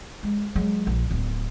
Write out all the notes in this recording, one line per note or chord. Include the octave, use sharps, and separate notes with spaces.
G#3
F#3 G#3
A#1
D1 B3